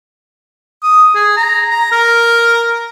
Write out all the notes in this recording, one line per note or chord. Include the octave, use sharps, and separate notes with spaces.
D#6
G#4
A#5
A#5
A#4